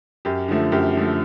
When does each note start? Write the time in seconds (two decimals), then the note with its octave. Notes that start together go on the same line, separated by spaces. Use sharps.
0.25 F#2 G4
0.48 D3 F3 A3
0.72 F#2 G4
0.95 D3 F3 A3